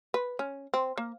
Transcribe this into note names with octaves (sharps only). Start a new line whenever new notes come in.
B4
C#4
C4
A#3